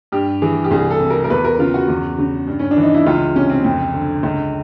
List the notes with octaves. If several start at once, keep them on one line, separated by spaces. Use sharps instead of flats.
G2 G4
E3 G#4
G4
C2 G#4
A4
C3
A#4
A#4
E2 B4
A#4
C#3 F4
F#4
E2
C#3
G2
C#4
D4
E3
D#4
E4
C#2 F4
C3 C#4
C4
F2
D3
C#2